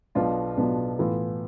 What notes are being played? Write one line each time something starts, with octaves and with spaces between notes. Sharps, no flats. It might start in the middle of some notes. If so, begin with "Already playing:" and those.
B1 B2 B3 D4 F4
B1 B2 B3 D4 F4
A2 E3 B3 F4